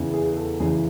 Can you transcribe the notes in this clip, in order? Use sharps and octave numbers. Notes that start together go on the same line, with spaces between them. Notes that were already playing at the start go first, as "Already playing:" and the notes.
Already playing: E2 C#3 E3
G#4
A4
E2 C#3 E3 G#4